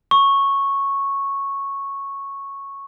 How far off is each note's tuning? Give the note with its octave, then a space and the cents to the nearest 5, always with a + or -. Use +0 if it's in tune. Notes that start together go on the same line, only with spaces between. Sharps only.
C#6 -5